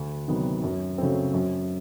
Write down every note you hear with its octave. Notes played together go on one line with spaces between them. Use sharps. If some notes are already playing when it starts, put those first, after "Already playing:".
Already playing: D2
C3 D#3 F#3 B3
F#2
C#3 F#3 A3 C4
F#2